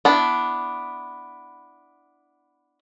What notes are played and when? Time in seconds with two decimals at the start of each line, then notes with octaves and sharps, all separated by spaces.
0.05 B3 D4 E4